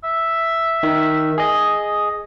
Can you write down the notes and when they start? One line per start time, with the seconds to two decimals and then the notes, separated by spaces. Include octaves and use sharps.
0.04 E5
0.83 D#3
1.38 G#4 D#5